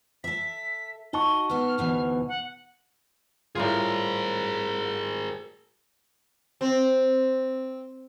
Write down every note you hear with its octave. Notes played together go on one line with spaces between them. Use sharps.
A4 E5 B6
D#4 F#4 D#5 A5 C#6 G7
B3 A4 F6
D2 B2 E3
F#5
A2 G3 F4 G#4 A#4
C4